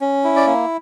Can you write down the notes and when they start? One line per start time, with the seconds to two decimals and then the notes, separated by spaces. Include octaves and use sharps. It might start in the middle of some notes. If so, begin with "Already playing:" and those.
0.01 C#4
0.24 E4
0.36 D5
0.46 A#3